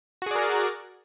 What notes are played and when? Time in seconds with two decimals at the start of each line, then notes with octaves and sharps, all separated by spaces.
0.22 F#4
0.26 G#4
0.31 D5
0.35 A#4